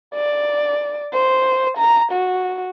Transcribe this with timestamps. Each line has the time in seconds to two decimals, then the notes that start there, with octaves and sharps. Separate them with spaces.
0.15 D5
1.13 C5
1.78 A#5
2.12 F#4